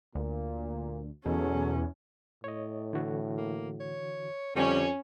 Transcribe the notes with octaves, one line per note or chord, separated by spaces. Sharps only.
D2 A#2
E2 B2 F#3 C#4 G#4 A4
A2 C#5 D#5
D3 E3 F#4
A#3
C#5
F2 D3 G3 C#4 D4